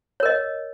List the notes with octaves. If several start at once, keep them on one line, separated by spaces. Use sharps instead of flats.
A#4 C#5 D#5